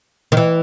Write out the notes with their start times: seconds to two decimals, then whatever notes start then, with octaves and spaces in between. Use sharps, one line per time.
0.32 D#3
0.37 E3